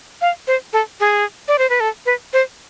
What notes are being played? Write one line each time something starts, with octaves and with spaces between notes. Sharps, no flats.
F5
C5
A4
G#4
D5
C5
B4
A4
B4
C5